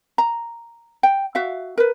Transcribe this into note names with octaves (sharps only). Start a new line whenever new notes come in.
A#5
G5
F#4 E5 F5
A#4 B4